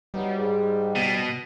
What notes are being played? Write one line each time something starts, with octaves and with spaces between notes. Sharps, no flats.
F#3 G3 B3 D#4
G#2
B2